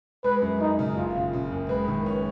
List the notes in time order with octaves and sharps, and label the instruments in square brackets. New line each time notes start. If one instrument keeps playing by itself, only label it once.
[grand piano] G#3 [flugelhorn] B4
[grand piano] F#2
[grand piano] F#2 [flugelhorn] D#4
[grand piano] C#3
[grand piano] F#1 [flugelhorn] F4
[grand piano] C#3
C#3
F#1
[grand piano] G#3 [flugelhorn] B4
[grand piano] D#3
C#4